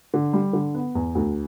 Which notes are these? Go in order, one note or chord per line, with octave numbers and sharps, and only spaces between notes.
D3
G3
D3
B3
E2
D2